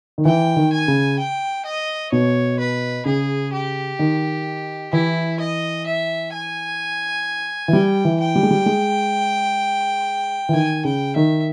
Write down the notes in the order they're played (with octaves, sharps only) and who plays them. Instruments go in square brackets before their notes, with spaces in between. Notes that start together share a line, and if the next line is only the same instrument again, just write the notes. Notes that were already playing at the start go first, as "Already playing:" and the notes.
[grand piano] D#3
[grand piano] E3 [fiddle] G5
[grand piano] D#3
[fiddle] G#5
[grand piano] C#3
[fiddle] G5
D#5
[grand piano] B2 [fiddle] C#5
[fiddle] B4
[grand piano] C#3 [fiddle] G#4
[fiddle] G4
[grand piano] D#3
[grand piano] E3 [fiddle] E4
[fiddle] D#5
E5
G#5
[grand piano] E3
[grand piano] G3 [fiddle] G5
[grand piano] E3
[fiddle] G5
[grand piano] G3
G#3
G3
G#3
E3
[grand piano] D#3 [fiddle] G#5
[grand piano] C#3 [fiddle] G5
[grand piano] D#3 [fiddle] E5